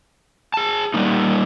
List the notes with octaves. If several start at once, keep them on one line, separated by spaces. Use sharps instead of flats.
G#4 A5
G3 A#3 D#4